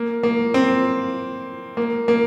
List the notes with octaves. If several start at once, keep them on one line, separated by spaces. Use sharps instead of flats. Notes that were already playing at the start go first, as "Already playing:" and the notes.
Already playing: A#3
A#3
C4
A#3
A#3